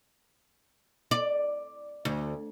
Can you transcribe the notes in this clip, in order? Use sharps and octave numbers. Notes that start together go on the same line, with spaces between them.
D5
D2